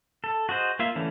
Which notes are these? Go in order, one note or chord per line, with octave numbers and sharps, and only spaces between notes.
A4
F#4 G#4 C5 D#5
A#3 F4 E5
D3 E3 A3 C#4